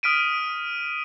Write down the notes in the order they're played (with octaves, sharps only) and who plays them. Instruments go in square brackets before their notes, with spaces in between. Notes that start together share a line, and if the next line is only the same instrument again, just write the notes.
[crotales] D#6 F6 B6 D7 D#7